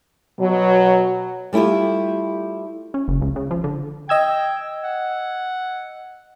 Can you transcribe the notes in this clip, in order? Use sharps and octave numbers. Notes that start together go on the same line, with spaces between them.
B2 F#3
G3 A3 E4 F4 G4
C#4
F#1
C#2
C#3
F3
D3
D#5 G5 E6 G#6
F#5